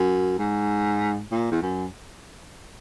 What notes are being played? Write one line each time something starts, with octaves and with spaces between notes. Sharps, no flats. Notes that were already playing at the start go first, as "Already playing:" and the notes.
Already playing: F#2
G#2
A#2
E2
F#2